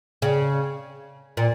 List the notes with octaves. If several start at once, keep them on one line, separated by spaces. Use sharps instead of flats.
C#3
A#2